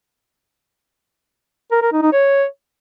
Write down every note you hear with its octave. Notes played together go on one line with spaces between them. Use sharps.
A#4
A#4
D#4
D#4
C#5